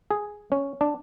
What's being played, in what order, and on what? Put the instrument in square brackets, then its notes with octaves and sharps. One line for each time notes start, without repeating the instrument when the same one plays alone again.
[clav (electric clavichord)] G#4
C#4
D4